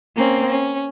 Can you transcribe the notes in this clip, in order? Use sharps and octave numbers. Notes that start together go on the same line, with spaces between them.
A#3 C4 C#4
C#4